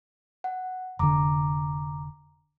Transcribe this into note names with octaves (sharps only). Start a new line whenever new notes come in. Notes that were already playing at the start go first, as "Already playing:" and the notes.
F#5
F1 D3 A#5 D6